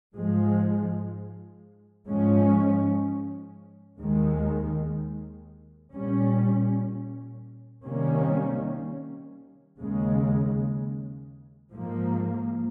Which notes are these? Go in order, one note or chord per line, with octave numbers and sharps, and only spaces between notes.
G#2 F3 G#3
G#2 F3 G#3 C#4
D#2 D#3 G#3
A#2 G3 C#4
C3 D#3 G3 A#3 C#4
D#2 C#3 G#3
G#2 F3 A#3